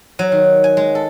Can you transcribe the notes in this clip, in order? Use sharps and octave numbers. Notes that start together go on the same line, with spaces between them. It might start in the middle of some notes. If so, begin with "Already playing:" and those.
F#3
D#3
G#5
G#3
A4